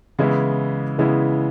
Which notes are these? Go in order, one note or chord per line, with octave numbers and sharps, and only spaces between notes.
C#3 E3 G#3 B3 E4
C#3 E3 G#3 B3 E4